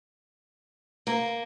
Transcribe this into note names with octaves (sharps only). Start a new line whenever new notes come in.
A#3